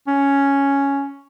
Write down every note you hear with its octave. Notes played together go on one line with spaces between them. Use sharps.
C#4